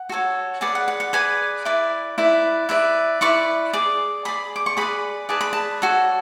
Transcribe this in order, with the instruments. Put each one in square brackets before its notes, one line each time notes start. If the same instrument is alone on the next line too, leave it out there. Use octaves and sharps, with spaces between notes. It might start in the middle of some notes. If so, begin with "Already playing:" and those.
Already playing: [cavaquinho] F#5
F#4 A4 C#5
G#4 B4 D5 F#5
F#5
F#5
F#5
G#4 B4 D5 G#5
E4 B4 D5
E4 B4 D5
E4 B4 D5
E4 B4 D5 C#6
G#4 D5
G#4 D5 B5
D6
C#6
G#4 B4 D5 B5
G#4 B4 D5 A5
B5
A5
F#4 A4 C#5